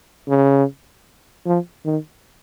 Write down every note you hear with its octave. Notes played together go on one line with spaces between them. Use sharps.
C#3
F3
D#3